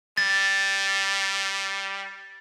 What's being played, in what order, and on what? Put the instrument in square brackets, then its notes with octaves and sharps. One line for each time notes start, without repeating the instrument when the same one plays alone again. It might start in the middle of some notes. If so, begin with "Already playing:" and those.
[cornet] G3 [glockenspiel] A6